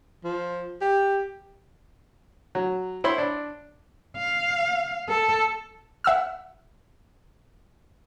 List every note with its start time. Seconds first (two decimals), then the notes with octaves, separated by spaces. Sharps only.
0.24 F3
0.81 G4
2.55 F#3
3.04 E4 C5 C#5 B5 C6
3.18 D4
4.17 F5
5.09 A4
6.04 E5 F#5 E6 F6